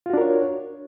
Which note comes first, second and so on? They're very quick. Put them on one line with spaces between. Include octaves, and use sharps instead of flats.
F4 F#4 D4 A#4 C#5